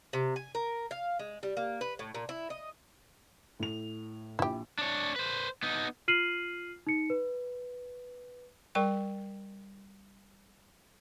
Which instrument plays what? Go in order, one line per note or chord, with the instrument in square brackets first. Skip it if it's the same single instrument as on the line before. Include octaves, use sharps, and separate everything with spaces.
[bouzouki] C3
G#5
A#4
F5
G#3
G3
A#3
B4
A2
A#2
E4
D#5
[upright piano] A2 F7
[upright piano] A#1 [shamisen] E4 G4
[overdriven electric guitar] D4 C#5
B4 C5
B3 D#4
[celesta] F4 F6 C7 D#7 F#7
D#4 C#7
B4
[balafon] G3 A#4 G5 C#6